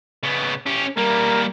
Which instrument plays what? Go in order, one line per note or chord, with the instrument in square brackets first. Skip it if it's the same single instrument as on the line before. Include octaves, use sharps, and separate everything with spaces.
[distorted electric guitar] C#3 B3
C#4 G4
[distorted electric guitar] G3 A#3 [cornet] A#4